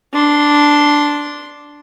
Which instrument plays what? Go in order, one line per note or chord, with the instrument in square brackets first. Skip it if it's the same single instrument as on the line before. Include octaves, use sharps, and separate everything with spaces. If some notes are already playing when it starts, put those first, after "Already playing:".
[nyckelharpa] D4 C6